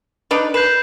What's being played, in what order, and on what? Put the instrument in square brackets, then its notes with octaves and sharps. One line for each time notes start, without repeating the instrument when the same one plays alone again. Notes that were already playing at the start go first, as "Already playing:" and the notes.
[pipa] D4 D#4 B4
[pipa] B4 [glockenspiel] G6 C7 E7